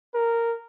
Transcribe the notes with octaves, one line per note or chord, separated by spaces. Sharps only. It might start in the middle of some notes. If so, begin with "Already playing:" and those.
A#4